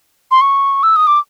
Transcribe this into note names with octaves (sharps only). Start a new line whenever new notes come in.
C6
C#6
E6
D#6
D6